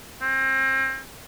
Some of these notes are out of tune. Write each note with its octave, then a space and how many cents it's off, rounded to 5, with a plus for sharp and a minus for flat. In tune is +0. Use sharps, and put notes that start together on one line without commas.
C4 +30